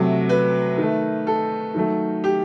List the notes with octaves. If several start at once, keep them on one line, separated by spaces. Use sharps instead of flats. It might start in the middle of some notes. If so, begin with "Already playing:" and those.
Already playing: C3 F#3 A3
B4
D#3 A3
A4
D#3 F#3 A3
G4